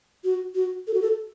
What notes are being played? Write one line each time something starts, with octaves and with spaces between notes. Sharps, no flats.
F#4
F#4
A4
F#4
A4